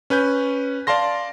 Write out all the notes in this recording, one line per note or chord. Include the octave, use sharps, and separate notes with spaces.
C#4 B4 G#5 G6
D5 F5 A5 C6 A#6